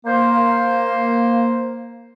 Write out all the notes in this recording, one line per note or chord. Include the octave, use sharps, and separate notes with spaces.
A#3 C5